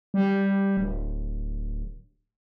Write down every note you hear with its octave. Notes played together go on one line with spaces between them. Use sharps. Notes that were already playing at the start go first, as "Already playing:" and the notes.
G3
D1